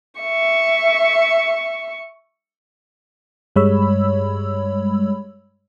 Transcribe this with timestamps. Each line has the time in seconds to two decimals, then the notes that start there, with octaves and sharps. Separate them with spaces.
0.21 E5 C#6
3.56 G2 G3 G#3 C#5 B5 E6